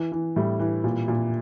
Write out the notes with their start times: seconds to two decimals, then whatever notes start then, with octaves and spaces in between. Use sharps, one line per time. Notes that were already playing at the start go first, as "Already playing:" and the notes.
Already playing: E3
0.12 E3
0.36 A2 G3
0.60 E3
0.84 A#2
1.08 A#2